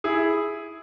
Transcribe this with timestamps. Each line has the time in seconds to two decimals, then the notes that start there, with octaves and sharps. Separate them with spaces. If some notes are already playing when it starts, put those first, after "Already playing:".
0.04 E4 G#4